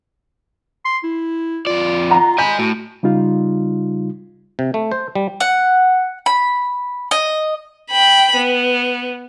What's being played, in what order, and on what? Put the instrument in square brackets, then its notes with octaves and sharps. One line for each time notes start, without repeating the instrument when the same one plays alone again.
[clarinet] C6
E4
[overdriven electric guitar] F2 D5 [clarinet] F4
[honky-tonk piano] F#5 A#5
[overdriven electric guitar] D#5 G#5 [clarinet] B5 [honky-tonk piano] G6
[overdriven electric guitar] A2 [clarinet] F#4
[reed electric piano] C#3 G3 D#4 F4
[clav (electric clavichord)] C3
A3
C5
G3
[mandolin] F#5
B5
D#5
[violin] G5 B5
B3